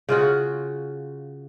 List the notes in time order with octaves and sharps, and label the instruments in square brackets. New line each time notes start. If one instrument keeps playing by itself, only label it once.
[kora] C#3 F4 F#4